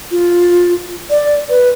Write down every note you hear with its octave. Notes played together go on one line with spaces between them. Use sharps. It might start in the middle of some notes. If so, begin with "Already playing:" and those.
F4
D5
B4